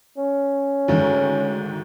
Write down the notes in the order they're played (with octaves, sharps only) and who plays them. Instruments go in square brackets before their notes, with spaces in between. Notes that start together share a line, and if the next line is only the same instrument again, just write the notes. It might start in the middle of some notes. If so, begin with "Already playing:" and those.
[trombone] C#4
[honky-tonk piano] D2 G#2 D#3